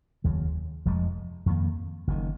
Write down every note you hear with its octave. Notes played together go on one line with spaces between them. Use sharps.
F1 D#2 C#3 F#3
F1 F2 F3 G#3
F2 D#3 A#3
F#1 F#2 D#3